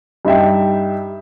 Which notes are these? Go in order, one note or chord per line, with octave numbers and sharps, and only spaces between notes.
G2 D#4 E5 G5